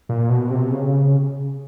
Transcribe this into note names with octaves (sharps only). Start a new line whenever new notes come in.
A#2
B2
C3
C#3